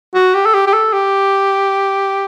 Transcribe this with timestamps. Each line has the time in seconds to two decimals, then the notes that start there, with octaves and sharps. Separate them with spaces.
0.15 F#4
0.34 G4
0.45 A4
0.54 G4
0.67 G4
0.73 A4
0.93 G4